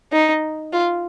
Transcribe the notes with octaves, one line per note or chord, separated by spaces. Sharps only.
D#4
F4